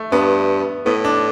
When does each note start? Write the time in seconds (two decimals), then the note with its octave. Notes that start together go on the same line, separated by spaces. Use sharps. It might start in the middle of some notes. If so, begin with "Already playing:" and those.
Already playing: A3
0.12 G2 B3
0.86 A2 B3
1.04 D4